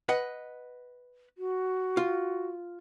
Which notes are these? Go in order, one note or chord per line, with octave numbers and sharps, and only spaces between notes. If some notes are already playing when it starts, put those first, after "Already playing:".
B4 D#5 F#5
F#4
F4